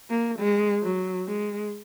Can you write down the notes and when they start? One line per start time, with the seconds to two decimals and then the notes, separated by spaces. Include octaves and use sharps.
0.10 A#3
0.39 G#3
0.83 F#3
1.27 G#3